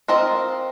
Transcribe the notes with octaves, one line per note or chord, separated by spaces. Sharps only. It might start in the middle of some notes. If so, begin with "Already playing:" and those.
C4 F4 A#4 D#5